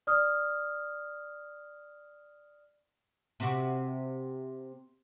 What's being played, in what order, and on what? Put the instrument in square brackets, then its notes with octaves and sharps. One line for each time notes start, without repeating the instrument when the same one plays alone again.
[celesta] D5 D#6 F6
[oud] C3 F#4